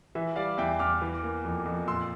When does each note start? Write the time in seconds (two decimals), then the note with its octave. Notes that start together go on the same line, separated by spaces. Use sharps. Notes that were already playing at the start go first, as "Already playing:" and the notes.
0.15 E3 E5
0.36 G3 D5 F5
0.58 E2 E5 G5
0.79 E2 D6 F6
1.01 E3
1.23 A#3
1.44 F2
1.66 F2
1.88 A#2 C6 E6